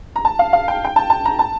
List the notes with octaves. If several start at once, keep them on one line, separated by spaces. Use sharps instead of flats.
A#5
A5
F5
F5
G5
G5
A5
A5
A#5
A5